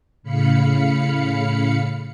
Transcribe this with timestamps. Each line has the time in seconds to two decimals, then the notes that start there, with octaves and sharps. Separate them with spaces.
0.23 A2 C#3 F5 B5 C#7